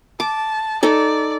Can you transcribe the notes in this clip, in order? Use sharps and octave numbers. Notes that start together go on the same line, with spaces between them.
A5 D6
D#4 A4 D5